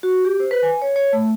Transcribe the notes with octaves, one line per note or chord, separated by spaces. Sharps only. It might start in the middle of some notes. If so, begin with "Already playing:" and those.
F#4
G4
C5
B4
G#5
C#5
C#5
A3